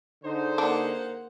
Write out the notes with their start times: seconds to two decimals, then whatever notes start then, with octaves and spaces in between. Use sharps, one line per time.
0.24 D3 D#4 G#4 C5
0.58 A#3 D4 F#5